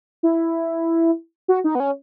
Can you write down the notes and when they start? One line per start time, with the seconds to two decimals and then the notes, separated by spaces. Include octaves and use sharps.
0.23 E4
1.48 F#4
1.64 D#4
1.75 B3
1.80 C#4